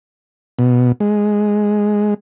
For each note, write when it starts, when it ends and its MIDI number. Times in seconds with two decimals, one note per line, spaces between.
0.59 0.92 47
1.00 2.14 56